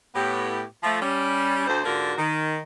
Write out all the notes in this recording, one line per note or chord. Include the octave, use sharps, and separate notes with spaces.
A2 B3 G4
F3 A3
G3 C#4
D2 C5
G#2 D3 D4 F4 F#4 A#4
D#3